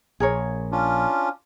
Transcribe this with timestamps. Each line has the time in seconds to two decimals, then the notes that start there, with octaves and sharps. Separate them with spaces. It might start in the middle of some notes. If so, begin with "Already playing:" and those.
0.20 A#1 G#4 A#4 C#5
0.72 C#4 D4 F4